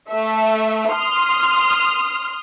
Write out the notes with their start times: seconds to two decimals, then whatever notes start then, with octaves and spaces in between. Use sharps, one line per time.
0.10 A3 E5
0.91 C6 D#6 F6